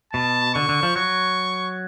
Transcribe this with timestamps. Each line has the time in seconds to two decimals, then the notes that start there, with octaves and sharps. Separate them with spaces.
0.13 B2 A5
0.54 D3 C#6
0.69 D3
0.83 F3
0.96 F#3 C#6